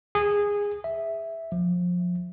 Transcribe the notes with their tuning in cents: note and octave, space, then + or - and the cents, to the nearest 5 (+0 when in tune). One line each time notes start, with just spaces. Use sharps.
G#4 -15
E5 -5
F3 +25